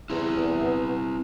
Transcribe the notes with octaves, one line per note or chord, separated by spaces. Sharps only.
E2 C4 E4
E2
B3